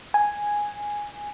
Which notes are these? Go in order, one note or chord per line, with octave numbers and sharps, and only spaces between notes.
G#5